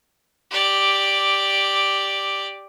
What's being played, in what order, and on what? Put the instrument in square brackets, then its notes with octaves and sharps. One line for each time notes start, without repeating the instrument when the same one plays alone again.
[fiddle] G4 D5